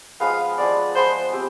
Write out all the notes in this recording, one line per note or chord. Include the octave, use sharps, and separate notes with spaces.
F3 G#3 B3 F5
F3 G#3 B3 D5
F3 G#3 B3 C5
C4 G4